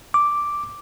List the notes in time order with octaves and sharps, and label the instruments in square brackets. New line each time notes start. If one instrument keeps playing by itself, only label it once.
[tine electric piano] D6